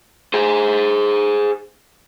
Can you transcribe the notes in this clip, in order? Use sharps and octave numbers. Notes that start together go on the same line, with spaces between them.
G#4 C5